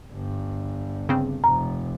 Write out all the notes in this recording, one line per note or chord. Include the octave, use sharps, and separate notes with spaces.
G1 G2
C#3 C4
F1 A#5